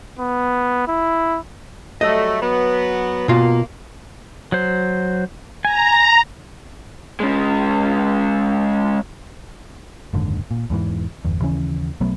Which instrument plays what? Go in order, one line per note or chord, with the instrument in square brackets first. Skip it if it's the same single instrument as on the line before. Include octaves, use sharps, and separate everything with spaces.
[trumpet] B3
E4
[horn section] F#3 G3 A3 [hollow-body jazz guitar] D#5
[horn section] F#3 B3
[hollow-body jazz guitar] B2 F4 [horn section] A#3
[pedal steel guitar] F#3 C5
[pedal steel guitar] G#5 [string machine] A#5
[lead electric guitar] G#3 C#4
[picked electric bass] F#1 D#2 G#2 D3
A#2
E2 G#2 E3
G1 E2
D#2 C#3 E3 C#4
B1 F#3 A3 B3